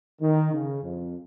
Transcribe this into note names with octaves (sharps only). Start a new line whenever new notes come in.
D#3
C#3
F2